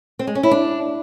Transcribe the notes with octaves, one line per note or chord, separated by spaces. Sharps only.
C4
G#3
C#4
E4
D4